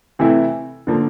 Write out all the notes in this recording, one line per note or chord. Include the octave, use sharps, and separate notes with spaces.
C3 E3 A3 E4
D3 F3 A#3